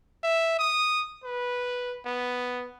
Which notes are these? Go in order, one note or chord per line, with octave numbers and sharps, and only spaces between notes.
E5
D#6
B4
B3